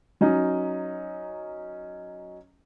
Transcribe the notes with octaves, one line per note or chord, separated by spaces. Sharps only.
F#3 C#4 D#4